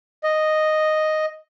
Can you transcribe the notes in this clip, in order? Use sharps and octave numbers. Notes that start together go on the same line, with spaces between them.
D#5